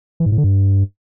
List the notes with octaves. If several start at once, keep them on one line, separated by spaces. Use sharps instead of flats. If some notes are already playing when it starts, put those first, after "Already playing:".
E3
G#2
A2
D3
G2